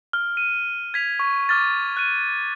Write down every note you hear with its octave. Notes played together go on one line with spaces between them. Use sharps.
F6
D#7
G#6 B6 F7
C#6
D6 F6 A6
F#6 D#7